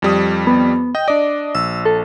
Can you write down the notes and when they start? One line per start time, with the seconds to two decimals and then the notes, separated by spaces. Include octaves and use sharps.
0.02 F2 G3 D#6
0.47 B3
0.95 D#5 G5
1.08 D4 D5 D#5
1.55 A#1 E6
1.85 A4